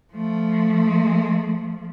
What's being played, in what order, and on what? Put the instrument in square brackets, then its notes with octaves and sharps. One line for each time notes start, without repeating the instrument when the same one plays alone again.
[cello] F3 A3